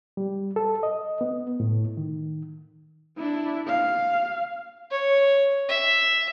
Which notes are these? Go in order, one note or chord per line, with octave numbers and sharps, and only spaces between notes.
G3
A4
D#5
B3
A2
D#3
D4 E4
F5
C#5
E5